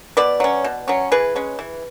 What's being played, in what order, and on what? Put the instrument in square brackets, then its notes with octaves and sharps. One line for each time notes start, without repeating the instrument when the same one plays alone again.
[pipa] B2 B4 D5
F#3 C#4
B2
F#3 C#4
E3 G#4 B4
G#3 C#4
E3